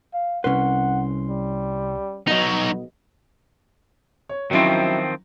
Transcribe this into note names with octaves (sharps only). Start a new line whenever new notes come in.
F5
C2 C#4 B4 F#5 C6
G3
B1 F#3 B3 D#4 D#5
C#5
D#3 F3 F#3 C4 C#4 E4